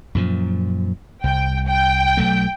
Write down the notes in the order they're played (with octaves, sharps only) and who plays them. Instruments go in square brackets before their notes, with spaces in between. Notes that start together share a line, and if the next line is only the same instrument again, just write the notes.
[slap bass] F#2 A#2 F3
[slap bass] C2 [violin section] G5
[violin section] G5
[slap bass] B1 F#3 A3